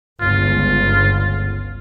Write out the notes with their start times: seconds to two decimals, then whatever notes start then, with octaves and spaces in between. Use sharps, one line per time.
0.21 G1 C#2 F4